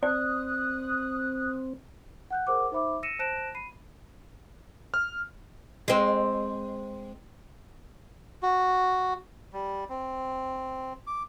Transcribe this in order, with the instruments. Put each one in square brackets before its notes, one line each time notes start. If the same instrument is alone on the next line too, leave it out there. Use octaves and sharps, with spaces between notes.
[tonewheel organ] C4 [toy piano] D5 [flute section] D#6 F#6
[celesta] F#5 F#6 G6
G#4 A#4 C5 F#5 D6
D#4 C5 E5 B5 D6
E6 A#6 C#7 D#7 E7
C5 A5 F#6 A#6 D7 E7
B5 C7 D#7
[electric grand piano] F6
[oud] G#3 C4
[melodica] F#4
G3
C4
D6